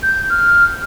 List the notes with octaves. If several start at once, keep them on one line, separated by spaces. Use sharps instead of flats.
G6
F6